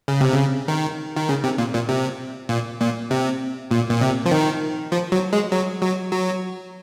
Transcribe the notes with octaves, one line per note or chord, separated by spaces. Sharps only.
C#3
C3
C#3
D#3
D#3
C#3
C3
A#2
A#2
C3
A#2
A#2
C3
A#2
A#2
C3
F3
D#3
F3
F#3
G#3
F#3
F#3
F#3